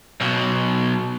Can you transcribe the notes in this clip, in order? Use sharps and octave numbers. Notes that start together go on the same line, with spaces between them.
B1 B2